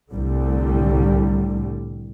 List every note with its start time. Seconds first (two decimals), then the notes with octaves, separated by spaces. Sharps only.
0.12 C2 A2 D3 G3